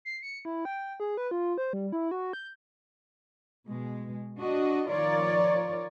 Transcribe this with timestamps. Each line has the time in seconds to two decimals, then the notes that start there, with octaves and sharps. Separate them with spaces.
0.05 C7
0.23 C#7
0.45 E4
0.65 G5
1.00 G#4
1.17 B4
1.31 F4
1.58 C5
1.73 G3
1.92 E4
2.11 F#4
2.33 G6
3.67 B2 G#3
4.40 D4 F#4 D#5
4.89 D#3 F3 F4 A#4 C#5 D5